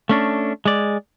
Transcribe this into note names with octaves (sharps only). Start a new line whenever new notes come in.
A3 C#4 D4
G#3 D5